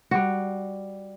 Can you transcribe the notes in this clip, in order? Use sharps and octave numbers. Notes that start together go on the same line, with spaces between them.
G3 F#4